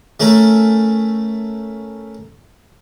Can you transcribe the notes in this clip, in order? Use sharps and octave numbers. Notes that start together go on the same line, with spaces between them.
A3 C#4 A4 A#4